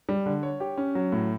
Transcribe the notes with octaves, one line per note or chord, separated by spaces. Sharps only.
G3
D3
C#5
G4
C#4
F#3
A2